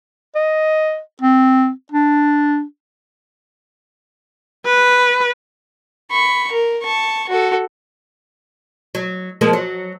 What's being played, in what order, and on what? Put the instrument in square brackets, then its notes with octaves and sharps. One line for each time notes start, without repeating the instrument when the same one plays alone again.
[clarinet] D#5
C4
D4
[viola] B4
[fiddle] B5 C#6
A#4
A5 C#6
F#4 A4
[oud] F#3
F3 G#3 A#3
F#3